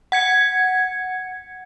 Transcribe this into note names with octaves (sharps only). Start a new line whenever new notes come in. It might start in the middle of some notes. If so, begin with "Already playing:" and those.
F#5 G#6 C#7